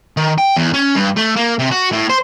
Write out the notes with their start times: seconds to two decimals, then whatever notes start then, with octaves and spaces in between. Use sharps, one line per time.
0.17 D#3
0.38 G5
0.56 E2
0.74 C#4
0.96 G2
1.17 A3
1.36 A#3
1.59 C3
1.71 F#4
1.92 A2
2.10 C5